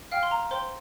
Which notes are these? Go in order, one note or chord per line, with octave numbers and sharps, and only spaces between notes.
F5 G5 F6
C6
A#5
C5 G5 C6